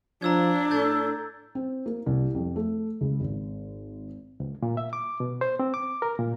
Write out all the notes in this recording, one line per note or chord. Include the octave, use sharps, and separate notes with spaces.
F3 D4 A#5 E6 G#6
A2 A4 G6 A6
C4
A#3
C2
F2
A3
C#2
G#1
C#2
A#2
E5
D6
B2
C5
C4
D6
A#4
A#2